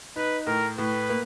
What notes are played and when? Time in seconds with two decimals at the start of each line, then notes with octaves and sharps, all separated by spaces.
0.16 D#4 B4
0.47 A2 A#4
0.78 A2 B4
1.10 A#3